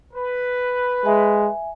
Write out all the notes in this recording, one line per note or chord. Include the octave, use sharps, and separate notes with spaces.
B4
G#3 E5 G#5